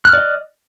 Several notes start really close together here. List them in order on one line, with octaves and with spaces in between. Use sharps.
F#6 F6 D5 D#5